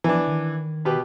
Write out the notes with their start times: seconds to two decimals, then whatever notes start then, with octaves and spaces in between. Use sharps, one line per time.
0.04 E3 F3 D4
0.27 D#3
0.85 B2 G4 B4